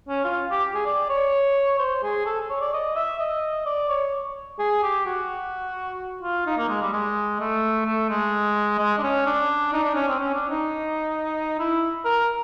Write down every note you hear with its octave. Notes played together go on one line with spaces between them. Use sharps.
C#4
F4
G4
G#4
D5
C#5
C5
G#4
A4
C#5
D5
D#5
E5
D#5
D5
C#5
G#4
G4
F#4
F4
D#4
A#3
G#3
G3
G#3
A3
A3
G#3
G#3
D4
C#4
D4
D#4
D4
C#4
C4
C#4
D4
D#4
E4
A#4